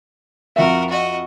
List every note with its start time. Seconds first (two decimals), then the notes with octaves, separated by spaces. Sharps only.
0.56 F2 F#4 A#4 E5
0.89 F#4 D#5